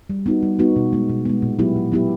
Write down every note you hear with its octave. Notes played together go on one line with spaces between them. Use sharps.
G3
B3 D#4 F#4
G3
B3 D#4 F#4
B2
G#3 B3
B2
G#3 B3
A#2
F#3 B3 E4 G4
A#2
F#3 B3 E4 G4